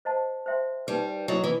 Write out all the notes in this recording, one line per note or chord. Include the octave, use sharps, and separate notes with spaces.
C5 D#5 F#5 A5
C5 E5 G5 C6
G3 D#4 G4 B4
F#3 E4 A4 D#5 F#5
E3